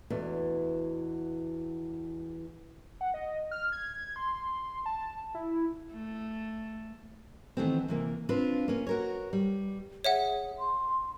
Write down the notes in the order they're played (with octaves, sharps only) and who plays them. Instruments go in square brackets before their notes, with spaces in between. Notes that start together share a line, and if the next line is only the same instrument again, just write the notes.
[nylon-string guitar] E2 B2 E3 A3 D4
[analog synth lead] F#5
D#5
F6
G#6
C6
A5
E4
[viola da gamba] A3
[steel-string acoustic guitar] D#3 E3 A3 B3 C4
C3 E3 A#3
C4 D4 F4 B4
A#3 C#4
F#4 A#4 C#5
G3
[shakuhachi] G#4 [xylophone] C#5 E5 F#5
[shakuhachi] C6